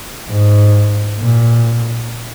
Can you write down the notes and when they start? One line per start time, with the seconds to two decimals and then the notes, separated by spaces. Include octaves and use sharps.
0.30 G#2
1.19 A#2